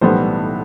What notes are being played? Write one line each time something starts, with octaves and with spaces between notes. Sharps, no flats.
B1 A2 E3 G3 B3 C5